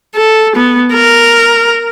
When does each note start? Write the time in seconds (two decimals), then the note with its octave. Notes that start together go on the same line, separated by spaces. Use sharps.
0.16 A4
0.56 B3
0.93 A#4